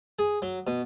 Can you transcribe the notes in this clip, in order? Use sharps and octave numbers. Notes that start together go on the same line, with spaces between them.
G#4
F#3
B2